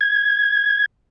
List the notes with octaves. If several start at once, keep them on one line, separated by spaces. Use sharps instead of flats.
G#6